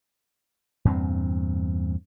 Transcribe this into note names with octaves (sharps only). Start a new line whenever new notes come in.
E2 G2 A#2 C4